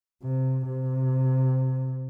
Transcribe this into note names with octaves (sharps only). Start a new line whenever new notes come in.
C3
C3